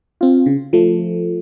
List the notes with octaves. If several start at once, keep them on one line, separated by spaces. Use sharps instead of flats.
C4 F4
C#3
F3 A3